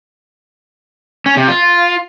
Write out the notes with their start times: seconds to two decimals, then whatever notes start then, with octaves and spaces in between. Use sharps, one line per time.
1.26 C#4
1.37 C3
1.48 F4